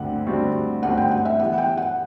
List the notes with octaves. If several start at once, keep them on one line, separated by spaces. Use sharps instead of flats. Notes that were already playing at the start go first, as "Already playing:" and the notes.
Already playing: D2 D3 G3 C4 F#5
D2 D3 G3 C4 F#4
D2 D3 G3 C4 F#4 F#5
G5
F#5
E5
E3 B3 E4 G4 F#5
G5
F#5